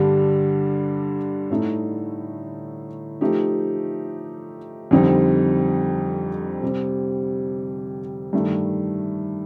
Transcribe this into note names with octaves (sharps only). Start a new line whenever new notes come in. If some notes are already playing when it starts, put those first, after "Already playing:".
Already playing: G2 D3 G3 D4
A2 A3 D#4
F3 A3 D#4 G4
F2 D3 G3 C4 D#4
C3 G3 C4
G2 D#3 A3